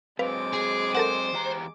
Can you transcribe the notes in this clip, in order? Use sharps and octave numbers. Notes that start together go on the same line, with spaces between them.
F#3 G#3 C4 B4 F5 D6
G#4
A4 A#4 C5 F#5
E2 G4 A#5